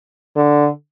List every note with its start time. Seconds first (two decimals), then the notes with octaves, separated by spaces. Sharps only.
0.36 D3